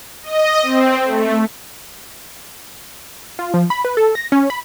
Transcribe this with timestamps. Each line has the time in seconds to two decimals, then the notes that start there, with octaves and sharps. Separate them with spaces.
0.23 D#5
0.62 C4
1.04 A3
3.39 F4
3.54 F3
3.70 B5
3.85 B4
3.97 A4
4.15 A#6
4.32 C#4
4.50 B5